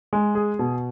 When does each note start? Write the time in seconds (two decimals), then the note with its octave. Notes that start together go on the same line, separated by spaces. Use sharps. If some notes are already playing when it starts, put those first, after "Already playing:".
0.13 G#3
0.35 G#4
0.59 B2